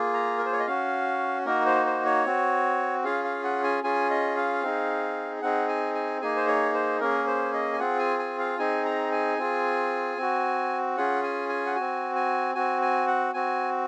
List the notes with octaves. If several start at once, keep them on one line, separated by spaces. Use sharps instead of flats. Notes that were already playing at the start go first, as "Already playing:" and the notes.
Already playing: A#3 F4 G#4
A#5
A#4
C5
C#5
D#5
C#4 F#4 F5
A#3 D#4 F#4 A#4
C5
C5
C#5
C4 F#4
C#4 F4 G#4 F5
F5
F#5
G#5
C#4 F4 G#4 G#5
D#5
F5
C4 D#4 G#4
C4 D#4 G#4 F#5
G#5
G#5
A#3 D#4 G#4 G#5
C5
C#5
C5
A#3 C#4 G#4 A#4
C5
D#5
G#5
C4 F4 G#4 F#5
G#5
G#5
F5
C4 D#4 G#4 G#5
A#5
G#5
C4 F4 G#4
C4 F#4
C#4 F4 G#4 F#5
G#5
G#5
F#5
C4 F#4 G#5
G#5
C4 F#4 G#5
G#5
F#5
C4 F#4 G#5